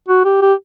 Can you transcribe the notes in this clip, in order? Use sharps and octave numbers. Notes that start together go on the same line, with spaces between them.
F#4
G4
G4